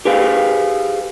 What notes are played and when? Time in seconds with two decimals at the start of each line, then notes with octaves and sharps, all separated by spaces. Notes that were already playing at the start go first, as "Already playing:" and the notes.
0.05 G4 G#4 B4 F5